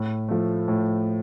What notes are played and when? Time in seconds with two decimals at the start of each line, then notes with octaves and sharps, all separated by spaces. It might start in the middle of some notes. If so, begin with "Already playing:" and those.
Already playing: A2
0.28 F3 A3
0.68 A2